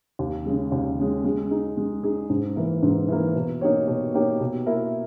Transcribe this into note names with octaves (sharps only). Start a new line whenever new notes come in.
D#2
C#3 G#3
D#2
C#3 G#3
G#3
D#4 G#4
G#3
D#4 G#4
G#2
E3 A#3
G#2
E3 A#3
B2
A#3 D#4 G4 C#5
B2
A#3 D#4 G4 C#5
B2
A#3 E4 A#4